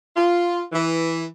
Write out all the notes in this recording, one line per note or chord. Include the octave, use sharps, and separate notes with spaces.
F4
E3